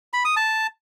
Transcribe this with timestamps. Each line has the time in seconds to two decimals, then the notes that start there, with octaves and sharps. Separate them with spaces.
0.13 B5
0.25 D#6
0.36 A5